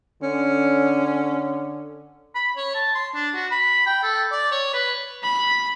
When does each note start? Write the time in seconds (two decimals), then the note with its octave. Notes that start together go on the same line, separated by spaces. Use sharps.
0.22 D3 C#4
2.35 B5
2.57 C#5
2.75 A5
2.95 C6
3.15 D4
3.35 F#4
3.51 B5
3.86 G5
4.03 A4
4.32 D5
4.52 C#5
4.74 B4
5.23 B5